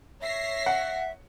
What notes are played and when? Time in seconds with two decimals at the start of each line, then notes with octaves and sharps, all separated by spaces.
0.22 C#5 E5 A#6 C7
0.66 F#5